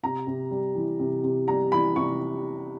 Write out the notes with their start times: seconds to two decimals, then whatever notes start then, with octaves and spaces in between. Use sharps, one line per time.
0.03 C3 A#5
0.27 C3
0.51 G3
0.75 E3
0.99 C3
1.23 C3
1.47 G3 A#5
1.71 E3 B5
1.95 C3 C#6